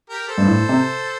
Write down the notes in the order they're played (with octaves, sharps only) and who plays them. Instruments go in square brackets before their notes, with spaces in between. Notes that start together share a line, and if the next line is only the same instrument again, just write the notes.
[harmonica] G4 A#4
A4 C5
[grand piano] G2
A2
C3